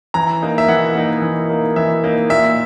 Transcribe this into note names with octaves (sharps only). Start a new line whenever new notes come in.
E3 A#5
A#3 D#4
E5
E3 F#5
A#3 D#4
E3
A#3 D#4
E3 E5
A#3 D#4
A#2 E5